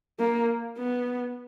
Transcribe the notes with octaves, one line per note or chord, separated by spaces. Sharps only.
A#3
B3